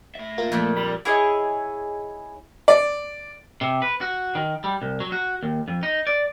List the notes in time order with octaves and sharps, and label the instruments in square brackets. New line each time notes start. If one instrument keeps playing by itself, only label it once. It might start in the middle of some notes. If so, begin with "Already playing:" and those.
[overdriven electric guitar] A2 E5
[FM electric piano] A#3 F4
[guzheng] F2 A#2 [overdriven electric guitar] A3
[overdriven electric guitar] G3 [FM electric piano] B5
[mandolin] E4 G#4 C#5 D#5
[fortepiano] D5
[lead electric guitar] C3
B4
F#4
D#3
G3
C2
F#3
F#4
D#2
F2
D#4
D5